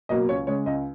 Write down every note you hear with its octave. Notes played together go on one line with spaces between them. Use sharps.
B2 F#3 A#3 D#5
C#2 C#5
C#3 G#3 C#5
C#2 D#5